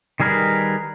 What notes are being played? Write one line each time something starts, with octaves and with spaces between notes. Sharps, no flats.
D#3 G3 G#4 A#4 B4